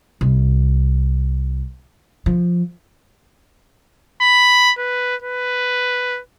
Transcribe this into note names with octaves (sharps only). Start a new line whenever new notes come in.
C2
F3
B5
B4
B4